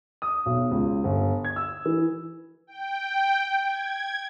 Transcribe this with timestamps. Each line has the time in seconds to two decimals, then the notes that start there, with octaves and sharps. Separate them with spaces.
0.22 D#6
0.46 B1
0.71 C#2
1.04 G1
1.45 G#6
1.56 E6
1.86 E3
2.67 G5
3.64 G#6